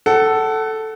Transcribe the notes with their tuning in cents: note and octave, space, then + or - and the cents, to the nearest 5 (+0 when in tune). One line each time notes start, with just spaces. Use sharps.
A4 +0 F#5 +25